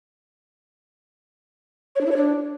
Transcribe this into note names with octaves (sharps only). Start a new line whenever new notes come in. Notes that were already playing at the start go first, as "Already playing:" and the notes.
C#5
D4
E4
C#5
D4